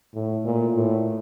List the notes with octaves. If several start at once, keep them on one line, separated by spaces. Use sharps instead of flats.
A2
A#2
A2